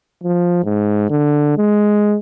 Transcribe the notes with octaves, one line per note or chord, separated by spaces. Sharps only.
F3
G#2
D3
G#3